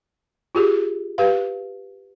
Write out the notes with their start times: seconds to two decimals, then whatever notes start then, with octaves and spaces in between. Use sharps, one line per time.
0.55 F4 G4 G#4
1.18 G4 B4 F5